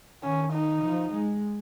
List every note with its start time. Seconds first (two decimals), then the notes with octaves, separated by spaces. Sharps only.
0.24 D#3 C#4
0.53 D#4
0.84 F3
1.13 G#3